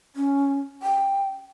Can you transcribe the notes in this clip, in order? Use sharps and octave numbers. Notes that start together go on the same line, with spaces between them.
C#4
G5